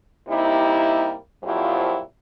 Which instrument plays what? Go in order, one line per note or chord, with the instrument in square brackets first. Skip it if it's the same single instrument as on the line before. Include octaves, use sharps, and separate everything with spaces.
[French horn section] C3 G3 A#3 D#4 E4
F2 A#2 F3 F#3 E4 G4